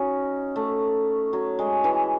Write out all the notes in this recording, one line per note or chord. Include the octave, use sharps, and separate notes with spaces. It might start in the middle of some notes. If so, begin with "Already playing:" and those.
Already playing: C#4 D#4 F#4
A3
F#3
G#3
E3